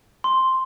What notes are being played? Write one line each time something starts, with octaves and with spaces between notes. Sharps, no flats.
C6